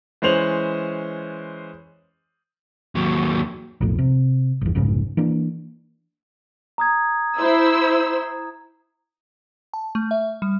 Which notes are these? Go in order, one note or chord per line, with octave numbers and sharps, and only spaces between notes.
E3 G#3 C#4 C5 F7 F#7
D#2 F#3
B1 F2 A2
C3
G1 E2
F1 B1 G#2 C#3
E3 A#3 D4
A#5 D#6 G#6
E4 C5 E6
A5
A3
E5
G3